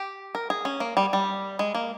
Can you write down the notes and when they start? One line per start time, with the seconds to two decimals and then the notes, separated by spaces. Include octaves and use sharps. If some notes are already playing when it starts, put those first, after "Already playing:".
Already playing: G4
0.35 A#4
0.50 G#4
0.65 C#4
0.80 A#3
0.97 G3
1.13 G3
1.59 G#3
1.75 A#3